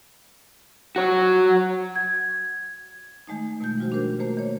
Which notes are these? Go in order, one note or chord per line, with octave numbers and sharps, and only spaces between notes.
F#4 C#5
G#6
D#3 G#3 A3 D#4
B2 A3 F4 G6
F3 G3 F4 F#4 C5
D4 F#4 G4 A#4 C5
D#3 A3 A#3 C5
D#3 C#5